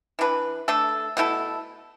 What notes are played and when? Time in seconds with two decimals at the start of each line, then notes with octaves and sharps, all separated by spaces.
0.19 E3 D4 B4
0.68 A3 D4 A4
1.17 B2 A3 E4 A4